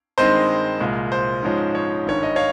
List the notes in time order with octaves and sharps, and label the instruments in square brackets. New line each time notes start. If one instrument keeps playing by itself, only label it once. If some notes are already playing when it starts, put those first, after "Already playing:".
[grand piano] G2 D#3 G#3 C4 C5 D#5
C2 A#2 G#3
C5
G#2 F3 G#3 C#4
C#5
G#1 G2 D#3 C#5
D#5
C#5 F5